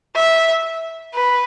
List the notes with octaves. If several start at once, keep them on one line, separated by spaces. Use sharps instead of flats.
E5
B4